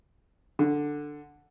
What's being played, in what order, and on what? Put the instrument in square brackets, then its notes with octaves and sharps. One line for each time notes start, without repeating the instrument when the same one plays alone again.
[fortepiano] D3